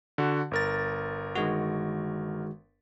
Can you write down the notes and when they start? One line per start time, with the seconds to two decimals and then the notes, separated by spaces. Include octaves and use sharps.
0.18 D3 F#4
0.51 G1 A#4 A6
1.35 D#3 G#3 F#4